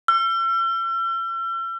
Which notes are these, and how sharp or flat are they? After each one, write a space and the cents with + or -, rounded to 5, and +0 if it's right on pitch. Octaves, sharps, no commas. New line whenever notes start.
E6 +45